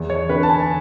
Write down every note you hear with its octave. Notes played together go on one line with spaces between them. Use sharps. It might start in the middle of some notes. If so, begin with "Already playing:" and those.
Already playing: E2
C#5
D3 B4
A5
G#5